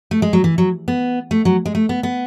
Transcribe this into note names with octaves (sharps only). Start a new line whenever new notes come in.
A3
G#3
F#3
E3
F#3
B3
A3
F#3
G#3
A3
B3
B3